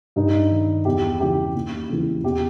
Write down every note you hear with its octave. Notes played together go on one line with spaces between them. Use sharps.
G2 D#4
D#3
E2 G4
C#3 E3 G4
D#2
C#3 E3
E2 G4